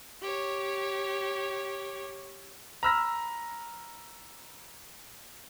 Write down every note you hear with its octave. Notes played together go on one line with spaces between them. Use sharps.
G4 C#5
A#5 B5 E6 F6 A#6